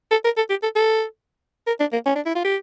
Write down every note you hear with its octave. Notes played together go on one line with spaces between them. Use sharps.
A4
A#4
A4
G4
A4
A4
A#4
D4
A#3
C#4
D4
E4
F4
G4